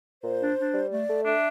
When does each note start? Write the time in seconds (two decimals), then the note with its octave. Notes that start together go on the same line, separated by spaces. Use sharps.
0.24 A#2 C5
0.41 D4
0.58 D4
0.74 G3
0.91 A3 D5
1.08 A3
1.25 D4 E5